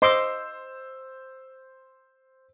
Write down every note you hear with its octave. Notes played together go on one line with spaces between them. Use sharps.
C5 D#5 C6 D6 E6